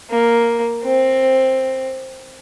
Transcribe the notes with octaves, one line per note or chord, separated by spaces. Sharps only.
A#3
C4